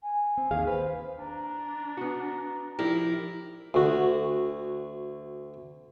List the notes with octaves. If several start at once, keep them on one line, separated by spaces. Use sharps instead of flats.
G#5
C4
D#2 G#4 F5
B4 C5
D4 A#5
B3 F#4
F3 E4 G4 A#4 D5
D2 F#4